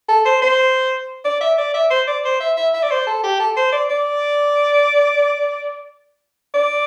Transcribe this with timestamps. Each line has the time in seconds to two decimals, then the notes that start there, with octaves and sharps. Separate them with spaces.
0.08 A4
0.25 C5
0.42 C5
1.24 D5
1.41 E5
1.58 D5
1.74 E5
1.91 C5
2.07 D5
2.24 C5
2.40 E5
2.57 E5
2.74 E5
2.83 D5
2.90 C5
3.07 A4
3.23 G4
3.39 A4
3.56 C5
3.73 D5
3.90 D5
6.54 D5